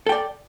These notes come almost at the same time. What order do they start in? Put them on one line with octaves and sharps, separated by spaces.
A4 G5 D5